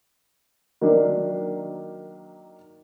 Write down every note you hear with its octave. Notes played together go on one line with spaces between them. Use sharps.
D#3 F#3 A#3 D4